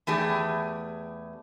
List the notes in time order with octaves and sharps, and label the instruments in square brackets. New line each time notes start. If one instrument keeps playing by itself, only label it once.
[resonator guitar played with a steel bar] E2 A3 G4 G#4